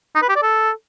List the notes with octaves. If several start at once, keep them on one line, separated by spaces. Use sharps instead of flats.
D#4
B4
G4
D5
A4